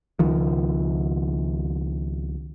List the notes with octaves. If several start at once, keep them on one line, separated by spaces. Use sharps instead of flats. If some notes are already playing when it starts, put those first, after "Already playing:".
C#2 D#3 F3